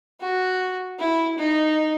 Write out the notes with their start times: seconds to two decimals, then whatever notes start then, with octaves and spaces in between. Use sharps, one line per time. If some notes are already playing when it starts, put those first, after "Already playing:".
0.21 F#4
0.99 E4
1.38 D#4